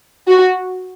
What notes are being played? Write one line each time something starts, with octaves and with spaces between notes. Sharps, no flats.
F#4